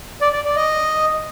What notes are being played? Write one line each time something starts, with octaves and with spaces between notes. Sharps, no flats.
D5
D5
D5
D#5